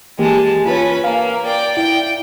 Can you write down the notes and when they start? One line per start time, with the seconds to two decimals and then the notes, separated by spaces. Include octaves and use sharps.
0.19 E3 G#3 A#3 G4 A5
0.66 C#4 F4 B4
1.04 A#3 F5
1.45 D5 G5
1.77 E4 G5